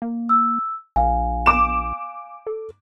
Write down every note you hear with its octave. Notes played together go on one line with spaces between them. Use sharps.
A#3
E6
A#1 F5 G#5
D6 E7
A4